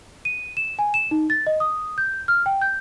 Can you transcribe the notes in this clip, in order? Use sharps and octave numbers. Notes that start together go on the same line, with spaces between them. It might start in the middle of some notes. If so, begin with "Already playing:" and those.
D#7
E7
G#5
E7
D#4
A6
D#5
D#6
G6
F6
G5
G6